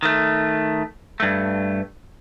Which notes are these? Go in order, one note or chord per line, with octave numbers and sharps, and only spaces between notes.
D#3 A3
G2 A3